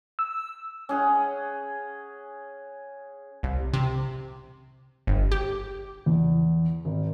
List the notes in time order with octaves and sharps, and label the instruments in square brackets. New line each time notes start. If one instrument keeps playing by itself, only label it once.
[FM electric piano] E6
[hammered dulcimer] C#4 G#4 F#5
[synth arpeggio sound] C2
C3
G1
G4
[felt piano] E2
G#1